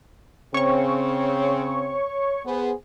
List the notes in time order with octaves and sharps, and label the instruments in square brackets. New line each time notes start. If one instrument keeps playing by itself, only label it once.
[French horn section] C#3 C4 [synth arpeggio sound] C#5 C#6
[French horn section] B3 G#4 C5